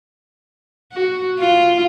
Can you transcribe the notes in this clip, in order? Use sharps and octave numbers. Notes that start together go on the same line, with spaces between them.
F#4
F4